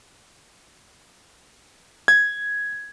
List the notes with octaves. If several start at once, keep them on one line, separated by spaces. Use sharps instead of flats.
G#6